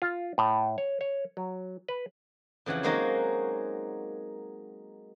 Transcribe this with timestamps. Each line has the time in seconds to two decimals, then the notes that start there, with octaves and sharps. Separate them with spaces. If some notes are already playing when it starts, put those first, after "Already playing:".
0.02 F4
0.38 A2
0.78 C#5
1.01 C#5
1.37 F#3
1.88 B4
2.66 F2 C#3 E3 G4 F#5
2.83 F#3 G#3 A#3 C4 D#4 F#4